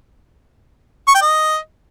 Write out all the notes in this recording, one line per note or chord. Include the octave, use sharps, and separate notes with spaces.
C#6
G5
D#5